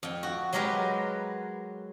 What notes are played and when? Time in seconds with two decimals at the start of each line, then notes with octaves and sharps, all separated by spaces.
0.03 F2 G5
0.23 F#4
0.53 F#3 G#3 G4 A#4 B4